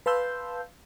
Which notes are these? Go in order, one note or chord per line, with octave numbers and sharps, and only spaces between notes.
B4 F5 A5 C6 E6 G6